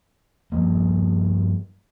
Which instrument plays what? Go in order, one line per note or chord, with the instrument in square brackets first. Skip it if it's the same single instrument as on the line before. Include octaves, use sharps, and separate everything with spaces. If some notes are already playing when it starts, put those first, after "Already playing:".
[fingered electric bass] G2 F3 G3 A#3